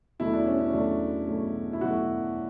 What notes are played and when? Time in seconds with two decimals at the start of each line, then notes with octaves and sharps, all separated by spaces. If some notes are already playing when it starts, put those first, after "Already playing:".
0.19 E2 B2 F#3 A3 E4
0.33 D4
0.46 C#4
0.60 C#4
0.73 E2 B2 F#3 A3 D4
1.27 E2 B2 F#3 A3
1.73 E4
1.81 E2 B2 F#3 A3 F#4